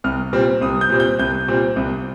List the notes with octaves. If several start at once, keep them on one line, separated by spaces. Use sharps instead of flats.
C2 F6
A#2 G3 C4
C2 D#6
G6
A#2 G3 C4
G6
C2 G6
A#2 G3 C4
C2